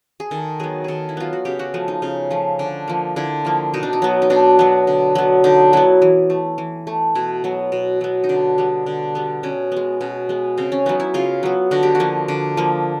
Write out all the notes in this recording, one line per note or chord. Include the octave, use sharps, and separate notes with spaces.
G#4
D#3 A4
F#3 B3 G#4
D#3 G#4 A4
E4
F#3 B3 F4
F#4
C#3 G4
F#4
F3 A3
D#4
C#3 F4
F3 A3
D3
F3 A#3
D3 E4
F3 A#3
B2 D#4
D4
D#4
F#3 B3
D#4
B2 D4
F#3 B3
D3
F#3 B3
D3 D#4
F#3 B3 E4
E3
A3
E3
A3
B2 E4
F#3 B3
B2
F#3 B3
D#4
D3 D4
G3 B3
D3
G3 B3
B2 C#4
G#3 B3
B2 C#4
G#3 B3
C#3 C4
C#4
F#3 B3 D#4
E4
C#3 F4
F#3 B3
D3 F#4
G4
F#4
F3 A#3
D3
F3 A#3